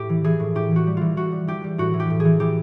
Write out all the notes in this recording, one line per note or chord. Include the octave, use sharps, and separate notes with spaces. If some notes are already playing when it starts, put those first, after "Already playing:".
Already playing: A2 G4
E3
E3 G#4
A2
A2 G4
E3 F#4
G3
E3 F4
E3 F#4
G3
E3 G4
G3
A2 F#4
E3
G4
A2
G#4
E3
E3 G4